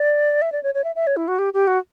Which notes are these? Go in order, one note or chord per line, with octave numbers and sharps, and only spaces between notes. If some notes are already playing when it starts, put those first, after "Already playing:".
Already playing: D5
E5
D5
C#5
C#5
E5
E5
C#5
E4
F#4
G4
G4
F#4